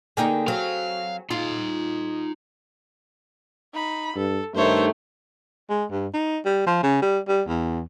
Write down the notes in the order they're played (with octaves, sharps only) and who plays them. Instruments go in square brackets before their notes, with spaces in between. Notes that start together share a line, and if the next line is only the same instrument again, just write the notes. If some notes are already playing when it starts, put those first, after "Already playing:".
[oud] D3 A#3 D#4 [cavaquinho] G#4 G5
[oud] F#3 C4 [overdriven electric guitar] F5
[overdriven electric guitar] D#4 C6 [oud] F4
[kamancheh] D#4 B5
[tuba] G2 [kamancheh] A4
[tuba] G2 [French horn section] D#3 A3 [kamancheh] C5 C#5
[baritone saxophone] G#3
G2
D#4
G3
F3
C#3
G3
G3
E2